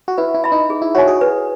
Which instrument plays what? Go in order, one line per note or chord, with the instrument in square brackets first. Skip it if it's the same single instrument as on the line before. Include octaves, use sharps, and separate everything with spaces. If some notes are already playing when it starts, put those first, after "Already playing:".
[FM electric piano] F#4
[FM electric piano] E4 [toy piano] B4
[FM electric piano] E4
[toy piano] E5 B5
[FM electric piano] D#4
[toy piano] G#4
[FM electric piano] E4
[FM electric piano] F#4 [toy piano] C#5 G#5
[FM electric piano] G#4
[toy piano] B4